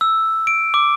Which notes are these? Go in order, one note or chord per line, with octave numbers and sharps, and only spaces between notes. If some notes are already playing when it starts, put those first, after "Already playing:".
E6
D7
D6